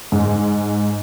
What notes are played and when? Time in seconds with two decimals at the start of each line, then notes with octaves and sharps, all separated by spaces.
0.12 G#2